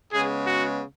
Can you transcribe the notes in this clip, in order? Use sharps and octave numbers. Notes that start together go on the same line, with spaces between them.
C#3 G#3 B3 G#4
F#4